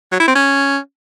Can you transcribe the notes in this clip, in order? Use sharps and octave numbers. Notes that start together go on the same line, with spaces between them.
F#3
E4
C4
C#4